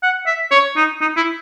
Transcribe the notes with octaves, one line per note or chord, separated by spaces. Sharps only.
F#5
E5
C#5
D#4
D#4
E4